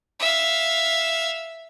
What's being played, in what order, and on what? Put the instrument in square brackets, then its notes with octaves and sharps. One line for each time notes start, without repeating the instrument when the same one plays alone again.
[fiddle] E5 F5